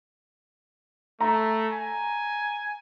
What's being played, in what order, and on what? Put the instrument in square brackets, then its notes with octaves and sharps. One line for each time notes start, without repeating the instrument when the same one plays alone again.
[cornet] A3 [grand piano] A#5
[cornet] G#5